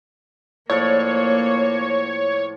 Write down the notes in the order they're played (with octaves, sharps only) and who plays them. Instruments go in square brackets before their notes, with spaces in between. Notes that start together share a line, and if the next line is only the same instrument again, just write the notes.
[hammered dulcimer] A2 F3 D5 [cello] A#3 [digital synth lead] C#5